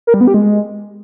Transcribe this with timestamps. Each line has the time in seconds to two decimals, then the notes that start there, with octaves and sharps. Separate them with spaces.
0.07 A#4
0.14 G3
0.21 B3
0.28 G4
0.34 G#3